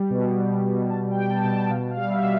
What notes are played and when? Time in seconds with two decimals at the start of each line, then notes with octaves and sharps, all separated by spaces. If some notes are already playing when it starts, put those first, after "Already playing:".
Already playing: G3
0.10 B2
0.37 G3
0.64 B2
0.90 B2 A5
1.11 G5
1.17 G3
1.30 A5
1.41 B2 A5
1.50 G5
1.70 B2 F5
1.91 F5
1.97 G3
2.10 E5
2.23 B2